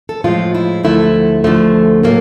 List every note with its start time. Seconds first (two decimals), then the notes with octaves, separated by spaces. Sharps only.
0.09 A4
0.24 A2 F3 G#3 F4
0.55 E4
0.83 D2 D3 F3 A3 E4
1.44 D2 D3 F3 A3
2.03 A2 F#3 A#3